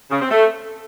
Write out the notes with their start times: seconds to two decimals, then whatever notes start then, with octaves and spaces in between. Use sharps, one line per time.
0.11 C#3
0.21 C4
0.31 A3